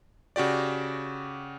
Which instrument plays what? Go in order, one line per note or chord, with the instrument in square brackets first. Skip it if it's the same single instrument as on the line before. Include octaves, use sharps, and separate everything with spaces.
[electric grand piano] C#3 F#4 G4 D5